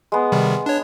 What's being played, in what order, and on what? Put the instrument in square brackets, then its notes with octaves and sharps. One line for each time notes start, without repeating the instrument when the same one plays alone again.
[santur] G#3 B3
[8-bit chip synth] C3 D#3 G3
D4 C#5